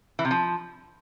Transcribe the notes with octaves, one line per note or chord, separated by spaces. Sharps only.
E3
C3
F3